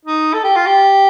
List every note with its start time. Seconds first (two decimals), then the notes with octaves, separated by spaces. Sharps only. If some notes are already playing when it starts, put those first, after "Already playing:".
0.05 D#4
0.33 A4
0.44 G4
0.56 F4
0.66 G4